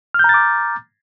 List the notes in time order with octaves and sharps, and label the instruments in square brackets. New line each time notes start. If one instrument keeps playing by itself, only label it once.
[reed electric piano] F6
G6
A#5
A6
D6